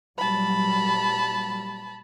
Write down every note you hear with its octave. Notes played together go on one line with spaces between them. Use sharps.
A#2 F#3 G3 A5 B5